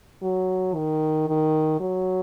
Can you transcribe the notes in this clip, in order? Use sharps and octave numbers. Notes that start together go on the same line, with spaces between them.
F#3
D#3
D#3
F#3